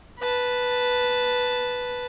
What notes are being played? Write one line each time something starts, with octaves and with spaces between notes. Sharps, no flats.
B4 A5